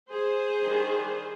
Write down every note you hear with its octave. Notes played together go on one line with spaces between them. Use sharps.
G#4 C5
D#3 G3 D4